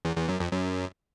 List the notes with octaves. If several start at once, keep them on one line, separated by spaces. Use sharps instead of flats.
E2
E2
F#2
F2
F#2